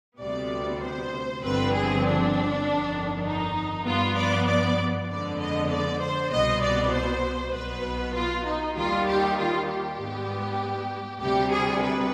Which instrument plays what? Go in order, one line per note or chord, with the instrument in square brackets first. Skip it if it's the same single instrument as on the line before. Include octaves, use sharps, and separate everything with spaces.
[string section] D2 C3 G3 B3 D5
C5
G1 G2 D3 F3 C4 B4
G#4
D4
G1 F2 D#3
D#4
G2 F3 B3 F4
D5
D5
F2 D3 G#3 B3 D5
D#5
D5
C5
C2 B2 B3 D#5
D5
C5
B1 B2 B3 B4
F4
D#4
D#2 D#3 G3 F4
G4
F4
G4
G#2 G3 B3
D2 C3 G3 G4
G#4
B4